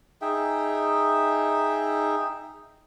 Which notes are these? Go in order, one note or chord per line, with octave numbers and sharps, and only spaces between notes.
D#4 G#4 E5 G5